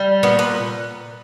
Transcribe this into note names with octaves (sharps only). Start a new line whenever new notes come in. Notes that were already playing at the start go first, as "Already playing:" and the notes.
Already playing: G3
A#2 B3
B3